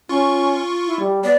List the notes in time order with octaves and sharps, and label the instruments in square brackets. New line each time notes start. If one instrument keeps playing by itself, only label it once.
[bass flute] C#4 [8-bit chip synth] F4 C#6
[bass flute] E4
G3
[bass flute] B3 [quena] D5